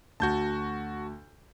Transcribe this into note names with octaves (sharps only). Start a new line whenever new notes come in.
D2 F#4 A5 G6